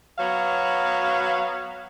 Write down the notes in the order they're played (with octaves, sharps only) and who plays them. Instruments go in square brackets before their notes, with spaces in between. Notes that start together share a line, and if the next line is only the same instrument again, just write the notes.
[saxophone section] F#3 B3 C#5 F5